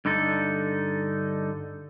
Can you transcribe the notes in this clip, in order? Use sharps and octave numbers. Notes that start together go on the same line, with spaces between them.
G2 D3 D#4 A4